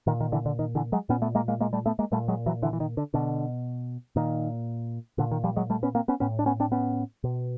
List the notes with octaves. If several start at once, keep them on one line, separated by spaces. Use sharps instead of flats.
A#2 D#3
D#3
D3 E3
D3
D#3
D3 E3
F#3 G#3
A#2 B3 C#4
A3 B3
G#3 A#3
G#3 A#3
G#3 A#3
G3 A3
A3 B3
G#3 A#3
A#2 G3 A3
F#3 G#3
E3 F#3
D3 E3
E3
D#3
D3
B2 D3
A#2 D#3
A#2 D3
D#3
F3 G3
F#3 G#3
G3 A3
B3 C#4
A#3 C4
B3 C#4
A2 B3 C#4
D4
B3 C#4
C4 D4
B3 C#4
B2